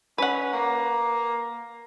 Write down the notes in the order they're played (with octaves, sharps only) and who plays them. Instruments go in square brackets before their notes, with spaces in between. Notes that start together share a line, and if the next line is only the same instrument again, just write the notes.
[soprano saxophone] C#4 [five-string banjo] B4 F#5
[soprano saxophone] A#3